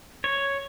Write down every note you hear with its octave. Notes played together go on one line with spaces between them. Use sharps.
C#5